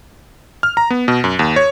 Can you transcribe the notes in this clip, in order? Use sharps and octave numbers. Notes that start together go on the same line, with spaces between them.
F6
A#5
B3
B2
F#2
D#2
C#5